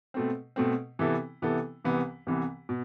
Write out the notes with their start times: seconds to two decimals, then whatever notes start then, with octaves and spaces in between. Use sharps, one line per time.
0.14 B2 A3 C4
0.56 B2 A3 C4
0.99 C3 E3 B3 E4 A4
1.42 C3 E3 B3 E4 A4
1.85 C2 C3 E3 B3
2.27 C2 C3 E3 B3
2.69 B2